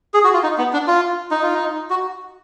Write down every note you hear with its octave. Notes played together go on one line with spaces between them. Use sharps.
G#4
F#4
F4
D#4
B3
D4
F4
D#4
F4
D#4
F#4